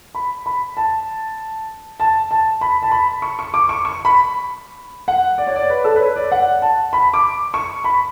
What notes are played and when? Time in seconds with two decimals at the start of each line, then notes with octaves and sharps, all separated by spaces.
0.15 B5
0.46 B5
0.77 A5
2.00 A5
2.31 A5
2.61 B5
2.82 A5
2.92 B5
3.22 C#6
3.39 C#6
3.54 D6
3.69 C#6
3.85 C#6
4.05 B5
5.08 F#5
5.38 D5
5.47 C#5
5.56 D5
5.70 B4
5.84 A4
5.96 B4
6.00 C#5
6.16 D5
6.32 F#5
6.62 A5
6.93 B5
7.14 D6
7.54 C#6
7.84 B5